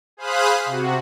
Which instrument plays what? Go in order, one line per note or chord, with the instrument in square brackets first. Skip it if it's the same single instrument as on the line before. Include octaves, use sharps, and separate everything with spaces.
[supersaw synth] G#4 C5 F5 B5 D#6 F#6
C3 F#4